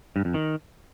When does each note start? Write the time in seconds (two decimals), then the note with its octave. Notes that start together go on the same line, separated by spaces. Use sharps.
0.16 G2
0.25 F2
0.34 D#3